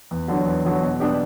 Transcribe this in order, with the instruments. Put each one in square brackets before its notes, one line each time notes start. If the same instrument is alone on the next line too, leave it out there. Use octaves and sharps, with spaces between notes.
[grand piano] E2
D3 F#3
E2
D3 F#3
B2
G3 B3 D4 G4